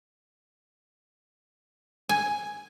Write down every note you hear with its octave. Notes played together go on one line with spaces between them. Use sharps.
G#5